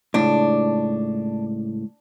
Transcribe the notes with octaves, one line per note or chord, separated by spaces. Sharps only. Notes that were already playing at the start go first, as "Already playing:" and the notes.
C#2 A2 D4